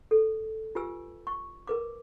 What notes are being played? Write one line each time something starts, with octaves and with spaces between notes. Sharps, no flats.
A4
F4 G4 B4 G#5 E6
C#6
A#4 B4 D6